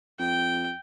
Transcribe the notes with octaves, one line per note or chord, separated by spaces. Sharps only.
F2 G5